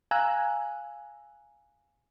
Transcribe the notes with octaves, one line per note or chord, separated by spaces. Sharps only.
F5 G#5 A#5 E6 F#6